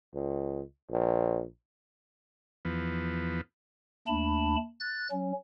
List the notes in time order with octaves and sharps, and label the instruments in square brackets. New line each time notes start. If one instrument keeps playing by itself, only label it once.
[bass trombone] C#2
A#1
[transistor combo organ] E2 F3 B3
[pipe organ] D#2 A3 D4 A5 B5
F#6 A6
F#3 C#4